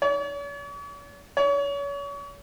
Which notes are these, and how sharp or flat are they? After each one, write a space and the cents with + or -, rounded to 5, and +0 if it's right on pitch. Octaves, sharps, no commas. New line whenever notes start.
C#5 +45
C#5 +35